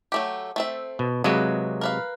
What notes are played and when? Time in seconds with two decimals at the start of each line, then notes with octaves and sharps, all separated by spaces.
0.12 F#3 A3 G4
0.56 A3 C4 E5
0.99 B2
1.24 C3 F#3 G#3 A#3 B4 D#5
1.81 A#4 B4 F5